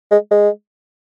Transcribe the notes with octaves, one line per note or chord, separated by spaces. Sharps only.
G#3
G#3